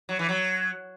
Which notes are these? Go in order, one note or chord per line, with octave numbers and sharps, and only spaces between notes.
F#3
E3
F#3